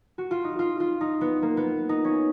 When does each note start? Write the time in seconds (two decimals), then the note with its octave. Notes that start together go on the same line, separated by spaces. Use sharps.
0.18 F#4
0.31 F4
0.44 D#4
0.59 F4
0.80 F4
1.01 D#4
1.21 B3
1.42 A#3
1.57 B3
1.89 D#4
2.04 C#4